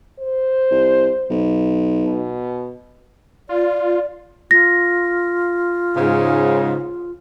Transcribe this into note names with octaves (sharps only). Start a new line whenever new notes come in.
C5
C2
B1
B2
F4 D5
F4 A#6
G#2 C#3